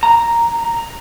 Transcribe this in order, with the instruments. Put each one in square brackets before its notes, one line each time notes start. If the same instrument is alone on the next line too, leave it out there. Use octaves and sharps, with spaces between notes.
[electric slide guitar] A#5